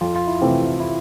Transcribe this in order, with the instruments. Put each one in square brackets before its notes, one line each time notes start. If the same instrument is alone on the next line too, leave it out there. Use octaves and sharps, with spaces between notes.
[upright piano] F2 [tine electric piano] F4
[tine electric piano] F4
E4
[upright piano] C3 E3 A3 C4
[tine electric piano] E4